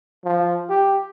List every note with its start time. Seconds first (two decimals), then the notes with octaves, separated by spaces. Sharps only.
0.25 F3
0.70 G4